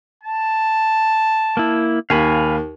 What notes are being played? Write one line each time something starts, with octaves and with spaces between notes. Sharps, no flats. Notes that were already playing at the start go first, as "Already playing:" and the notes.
A5
A#3 E4
D#2 F5 G#5 B5